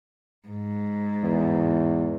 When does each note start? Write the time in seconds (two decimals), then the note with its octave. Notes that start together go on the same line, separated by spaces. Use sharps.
0.48 G#2
1.23 E2